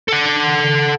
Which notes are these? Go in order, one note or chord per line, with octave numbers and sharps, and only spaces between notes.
A4 F#5